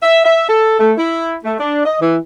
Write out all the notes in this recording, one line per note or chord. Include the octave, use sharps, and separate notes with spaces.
E5
E5
A4
A3
E4
A3
D4
D#5
E3